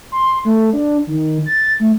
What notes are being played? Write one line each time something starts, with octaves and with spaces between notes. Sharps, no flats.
C6
A3
D4
D#3
A6
A3